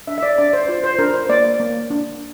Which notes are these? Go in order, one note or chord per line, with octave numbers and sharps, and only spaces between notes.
D4 E5
E5
D5
D4 D5
C5
F4 C5
C5
D4 A#4
C5
A#3 D5
A#3
D4